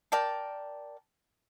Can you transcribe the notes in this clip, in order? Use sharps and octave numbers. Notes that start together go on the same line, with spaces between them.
A#4 D5 G5 A5